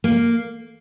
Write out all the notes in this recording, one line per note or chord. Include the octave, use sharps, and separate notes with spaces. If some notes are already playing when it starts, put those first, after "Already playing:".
A#3